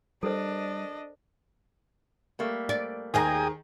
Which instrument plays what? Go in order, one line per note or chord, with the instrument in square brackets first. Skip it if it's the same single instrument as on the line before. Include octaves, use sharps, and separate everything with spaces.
[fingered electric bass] G3 [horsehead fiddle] D4 D#5 [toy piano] A4 A#4 C5
[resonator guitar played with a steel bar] G3 A3 A#3
[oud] D5
[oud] D#2 G#4 D#5 [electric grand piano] D#3 A#5 [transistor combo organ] G5 G#5 D#6